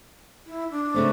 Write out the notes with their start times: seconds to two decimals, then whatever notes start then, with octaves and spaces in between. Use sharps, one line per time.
0.47 E4
0.71 D4
0.94 C#3 A3 C4